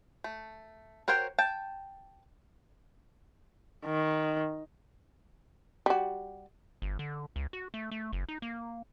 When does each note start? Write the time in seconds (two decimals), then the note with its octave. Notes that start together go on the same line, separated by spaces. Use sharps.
0.24 A3
1.08 F#4 A#4 C5 C#5 G5
1.38 G5 A5
3.85 D#3
5.86 G3 F#4
6.82 G1
6.99 D3
7.36 C#2
7.53 F#4
7.74 A3
7.91 A3
8.13 F#1
8.29 D#4
8.42 A#3